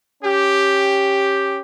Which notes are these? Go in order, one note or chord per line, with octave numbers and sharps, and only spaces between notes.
C#4 G4